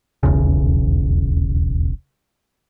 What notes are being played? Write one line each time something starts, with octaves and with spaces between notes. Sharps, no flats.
D#1 B1 E2 C#3